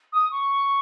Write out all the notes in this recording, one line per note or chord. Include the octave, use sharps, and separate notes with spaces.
D#6
C#6